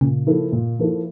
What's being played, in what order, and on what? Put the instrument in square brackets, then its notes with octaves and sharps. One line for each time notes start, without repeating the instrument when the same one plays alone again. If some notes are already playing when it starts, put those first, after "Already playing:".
[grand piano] A#2 [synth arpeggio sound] C#3
[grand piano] F3 A#3 E4 A4
A#2
F3 A#3 E4 A4